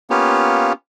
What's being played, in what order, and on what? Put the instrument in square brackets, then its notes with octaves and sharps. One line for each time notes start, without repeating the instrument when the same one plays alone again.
[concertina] A#3 B3 C#4 F4 G4